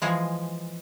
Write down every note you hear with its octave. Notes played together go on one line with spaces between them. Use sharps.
E3 F3 G#3